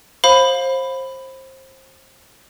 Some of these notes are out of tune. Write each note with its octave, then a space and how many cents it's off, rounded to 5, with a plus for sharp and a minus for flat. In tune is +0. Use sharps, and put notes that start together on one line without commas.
C5 +25 F5 +15 B5 +10